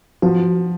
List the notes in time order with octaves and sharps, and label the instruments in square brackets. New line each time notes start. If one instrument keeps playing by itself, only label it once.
[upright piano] F3 [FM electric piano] F#4